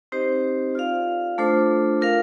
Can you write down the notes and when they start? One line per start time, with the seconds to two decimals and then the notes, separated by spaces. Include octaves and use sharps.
0.12 C4 D#4 G4 C5 D#5
0.75 F4 A4 D5 F5
1.38 A3 D4 F4 A4 C5
2.01 F4 A#4 F5